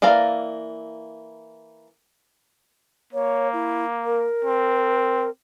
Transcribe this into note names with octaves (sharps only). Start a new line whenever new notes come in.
E3 A#3 D5 F5 A#5
A#3 C#5
E4
A#4
C4